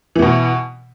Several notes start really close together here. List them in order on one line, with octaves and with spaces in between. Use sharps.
E3 B3 B2